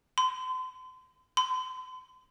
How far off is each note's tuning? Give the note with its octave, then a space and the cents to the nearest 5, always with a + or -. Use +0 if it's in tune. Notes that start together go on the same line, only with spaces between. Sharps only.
C6 -40
C6 -45